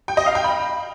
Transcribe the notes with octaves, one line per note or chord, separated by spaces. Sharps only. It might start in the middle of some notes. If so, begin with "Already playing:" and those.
G5
D#5
F5
G5
B5